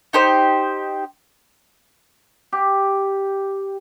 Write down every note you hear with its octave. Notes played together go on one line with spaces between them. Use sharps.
D#4 G4 C5
G4